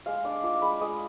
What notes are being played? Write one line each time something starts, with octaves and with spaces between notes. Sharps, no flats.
G#3 F5
D4 D6
F4 D6
G#3 B5
G#3 D#6